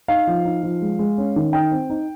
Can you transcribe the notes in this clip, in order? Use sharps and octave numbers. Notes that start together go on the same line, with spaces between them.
D#4 F5
F3
D#4
F3
G#3
G#3
C#4
D#3
D#4 G5
C4
D#4